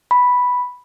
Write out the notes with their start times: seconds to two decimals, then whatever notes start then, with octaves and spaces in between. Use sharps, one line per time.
0.11 B5